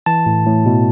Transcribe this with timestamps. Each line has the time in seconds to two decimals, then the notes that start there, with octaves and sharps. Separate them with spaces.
0.06 E3 A5
0.26 A2
0.46 A2
0.66 B2